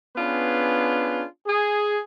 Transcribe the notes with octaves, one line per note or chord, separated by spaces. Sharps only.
B3 C#4 D4 F4 G#4 B4
G#4